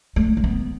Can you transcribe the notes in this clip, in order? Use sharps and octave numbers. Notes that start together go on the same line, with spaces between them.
A3
A3
B3